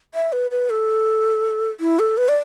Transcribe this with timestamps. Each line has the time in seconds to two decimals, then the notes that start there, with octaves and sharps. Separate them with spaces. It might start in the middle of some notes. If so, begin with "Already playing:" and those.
0.14 E5
0.32 B4
0.51 B4
0.70 A4
1.80 E4
1.99 A4
2.17 B4
2.29 D5